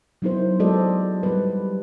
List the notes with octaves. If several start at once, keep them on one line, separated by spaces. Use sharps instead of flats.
F#3 B3 D#4 E4 A#4 C5
G#3 F#4 A4 C5 D5 D#5
G3 B4